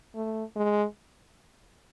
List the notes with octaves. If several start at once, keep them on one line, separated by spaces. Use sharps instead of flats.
A3
G#3